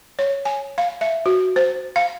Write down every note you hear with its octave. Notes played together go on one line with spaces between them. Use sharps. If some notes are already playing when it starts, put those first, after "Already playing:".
C#5
G#5
F5
E5
F#4
C5
F5